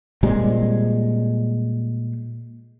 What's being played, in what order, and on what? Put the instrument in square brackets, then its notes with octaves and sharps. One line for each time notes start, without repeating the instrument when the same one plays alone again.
[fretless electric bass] A#2 G3 G#3 C4